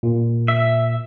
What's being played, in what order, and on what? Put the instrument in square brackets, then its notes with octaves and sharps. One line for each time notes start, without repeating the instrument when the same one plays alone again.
[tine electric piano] A#2
[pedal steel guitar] E5